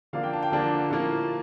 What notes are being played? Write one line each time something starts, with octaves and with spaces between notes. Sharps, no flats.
D3 F3 A#3 D4 F5
G5
A5
G5
D3 F3 A#3 D4 A5
A2 F3 A#3 F4